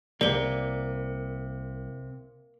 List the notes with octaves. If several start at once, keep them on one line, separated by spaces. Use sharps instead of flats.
C2 C3 A#3 D5 G7